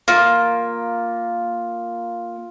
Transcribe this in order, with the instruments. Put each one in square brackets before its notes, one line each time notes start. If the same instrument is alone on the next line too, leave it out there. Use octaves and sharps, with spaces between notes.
[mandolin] A#3 [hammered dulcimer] F4